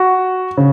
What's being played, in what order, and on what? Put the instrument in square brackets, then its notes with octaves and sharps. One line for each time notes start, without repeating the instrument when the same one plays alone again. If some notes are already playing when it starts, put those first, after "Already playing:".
Already playing: [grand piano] F#4
C#3